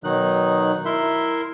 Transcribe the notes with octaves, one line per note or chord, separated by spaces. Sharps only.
B2 D#3 F#3 D#4 F#6
E4 A#4 E5 C6